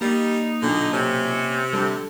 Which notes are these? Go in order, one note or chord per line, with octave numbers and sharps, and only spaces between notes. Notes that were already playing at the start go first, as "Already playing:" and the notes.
G3 A#3 D#4
B1 A#2 D3
C3 C#4
D3 G3 A4